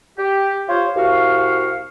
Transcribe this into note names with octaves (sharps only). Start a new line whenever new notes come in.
G4
F4 G4 C5 C#5
C2 F#4 F5